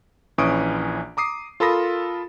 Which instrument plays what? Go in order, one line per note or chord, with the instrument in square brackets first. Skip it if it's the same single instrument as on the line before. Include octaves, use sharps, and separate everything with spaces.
[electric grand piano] A#1 E3 C#4 C#6 D#6 D7
A#5 D6 D#6 C7
F4 A4 A#4 B5 D#6 A#6